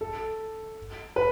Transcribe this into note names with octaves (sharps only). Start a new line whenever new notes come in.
A4
B4